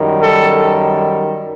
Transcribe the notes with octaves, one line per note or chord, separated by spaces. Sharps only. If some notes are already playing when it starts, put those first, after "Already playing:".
Already playing: F#2 D#3 G3
A4